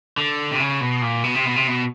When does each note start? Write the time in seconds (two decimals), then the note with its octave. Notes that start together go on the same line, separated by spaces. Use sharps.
0.17 D3
0.52 C3
0.60 C#3
0.81 B2
1.02 A#2
1.24 B2
1.35 C3
1.45 B2
1.56 C3
1.67 B2